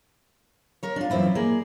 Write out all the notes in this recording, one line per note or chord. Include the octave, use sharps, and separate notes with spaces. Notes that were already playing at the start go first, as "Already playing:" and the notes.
A#4 C#5
D4 F4
F#2 E3 C4 E4 F4
A#3 G#4 D5